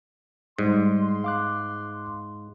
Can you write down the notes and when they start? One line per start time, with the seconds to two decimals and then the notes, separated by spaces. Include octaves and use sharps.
0.59 G#2 G3 C6
1.24 F5 D6 F#6